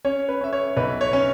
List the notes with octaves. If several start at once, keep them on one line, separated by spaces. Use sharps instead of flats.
C#4 C#5
B4
C#4 E5
C#5
B1 B4
C#5
C#4